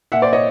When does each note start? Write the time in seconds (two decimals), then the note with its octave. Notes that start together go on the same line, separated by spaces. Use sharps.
0.12 A#2 E5 F#5
0.22 C5 D5
0.33 C#5 D#5